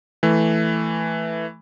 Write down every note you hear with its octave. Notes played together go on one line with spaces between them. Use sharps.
E3 A3